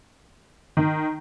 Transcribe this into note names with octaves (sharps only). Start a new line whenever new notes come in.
D#3